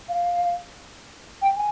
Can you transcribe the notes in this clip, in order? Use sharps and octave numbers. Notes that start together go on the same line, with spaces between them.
F5
G5
G#5